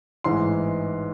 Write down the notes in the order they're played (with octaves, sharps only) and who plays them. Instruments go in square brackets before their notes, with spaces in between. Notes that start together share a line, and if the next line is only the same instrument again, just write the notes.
[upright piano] A1 G#2 E3 G#3 C6